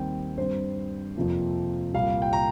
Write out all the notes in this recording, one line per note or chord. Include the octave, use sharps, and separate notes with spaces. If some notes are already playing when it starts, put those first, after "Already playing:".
Already playing: D#2 D#3 G3 C4 G5
G2 G3 C4 C5
F2 C3 F3 A#3
C2 A#2 G3 F5
G5
A#5